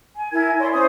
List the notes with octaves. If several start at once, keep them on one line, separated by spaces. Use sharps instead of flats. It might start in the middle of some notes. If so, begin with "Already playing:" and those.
G#5
E4 A#4 G#5 G#6
C#5 D5 B5 C6
C#4 C5 D#6